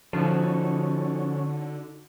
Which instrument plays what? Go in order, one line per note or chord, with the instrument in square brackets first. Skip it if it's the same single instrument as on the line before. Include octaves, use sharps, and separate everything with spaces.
[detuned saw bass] D3 [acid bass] F3 [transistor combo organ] C#4 [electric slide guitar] D#4 F#4 A4